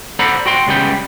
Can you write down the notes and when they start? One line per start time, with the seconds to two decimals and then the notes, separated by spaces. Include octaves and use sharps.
0.19 A4 C5 D5 F#5 A#5 B5
0.46 F#4 G5 C6
0.67 C#2 C#3 G3 B3 G5